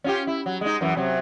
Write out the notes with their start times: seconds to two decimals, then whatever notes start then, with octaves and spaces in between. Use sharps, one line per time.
0.04 C#4 F4 G4
0.27 E4
0.46 F#3
0.61 G#3 D#4
0.81 F#2 E3
0.96 C3 F#3